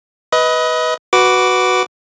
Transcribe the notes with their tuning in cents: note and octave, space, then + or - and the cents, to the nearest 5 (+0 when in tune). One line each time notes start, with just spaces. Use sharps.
B4 +0 D#5 +25
F#4 +0 B4 +0 D6 -10